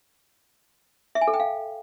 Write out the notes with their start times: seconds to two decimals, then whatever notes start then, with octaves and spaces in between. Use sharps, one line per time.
1.15 E5
1.21 G#5
1.28 A4
1.34 G5
1.40 F5